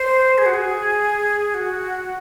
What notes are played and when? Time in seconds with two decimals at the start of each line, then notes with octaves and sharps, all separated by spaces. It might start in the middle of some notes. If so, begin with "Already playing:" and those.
Already playing: C5
0.38 G#4
0.46 F#4
0.54 G#4
1.54 F#4